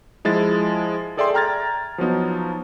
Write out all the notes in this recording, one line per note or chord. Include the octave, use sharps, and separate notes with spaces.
F3 G#3 E4 A6
G#4 A4 D5 E5 G5 C6
G5 A#5 F6 G#6 A6
F3 F#3 B3 D#4